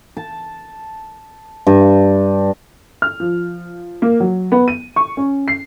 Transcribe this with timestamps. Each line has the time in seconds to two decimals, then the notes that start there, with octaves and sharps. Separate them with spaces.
0.17 A5
1.67 G2
3.02 F6
3.20 F3
4.02 A#3
4.20 F#3
4.52 B3
4.68 D#7
4.96 C#6
5.17 C#4
5.48 C7